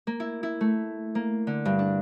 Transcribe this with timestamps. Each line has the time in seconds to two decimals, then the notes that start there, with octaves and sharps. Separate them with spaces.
0.07 A#3
0.20 E4
0.43 E4
0.61 A3
1.15 A#3
1.47 D3
1.65 G2
1.79 D4